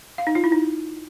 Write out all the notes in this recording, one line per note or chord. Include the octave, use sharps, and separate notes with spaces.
F5
D#4
F4
E4
D#4